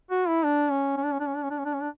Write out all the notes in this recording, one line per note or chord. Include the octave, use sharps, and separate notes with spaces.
F#4
E4
D4
C#4
C#4
D4
C#4
D4
C#4
D4
C#4
D4
C#4
D4
C#4
D4